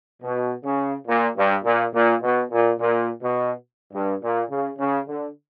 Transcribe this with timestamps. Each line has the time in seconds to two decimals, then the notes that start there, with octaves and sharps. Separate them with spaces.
0.22 B2
0.64 C#3
1.07 A#2
1.36 G2
1.64 A#2
1.94 A#2
2.23 B2
2.51 A#2
2.79 A#2
3.22 B2
3.93 G2
4.22 A#2
4.51 C#3
4.79 C#3
5.07 D3